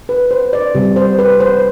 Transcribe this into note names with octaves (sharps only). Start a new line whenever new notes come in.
B4
C5
D5
C3 G3
C5
B4
C5